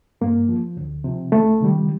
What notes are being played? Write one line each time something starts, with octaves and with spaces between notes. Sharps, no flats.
G2 A#3
F3
D2
C3 F3
C2 A3
C3 D#3 G3